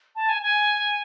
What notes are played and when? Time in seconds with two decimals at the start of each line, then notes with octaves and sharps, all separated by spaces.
0.16 A5
0.29 G#5
0.42 G#5